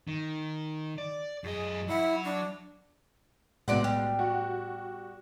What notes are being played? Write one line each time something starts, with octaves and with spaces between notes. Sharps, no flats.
D#3
D5
F#2 G#4 D#5
F#3 E4 F#5
D4
B1 A2 C3 G#3 B3 D5 F#5
G3
F#4